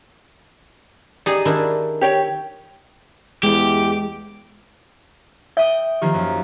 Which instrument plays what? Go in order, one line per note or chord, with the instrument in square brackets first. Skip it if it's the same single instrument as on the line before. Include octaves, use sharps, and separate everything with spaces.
[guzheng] D#4 G#4 [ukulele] G4 D5
[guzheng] D#3 D4 E4
[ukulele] G4 C#5 G5
[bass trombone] E2 [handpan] G#3 [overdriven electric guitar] G4
[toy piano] E5 [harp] G5 D#6
[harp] D#3 F3 A#3 [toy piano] G4
[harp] F#2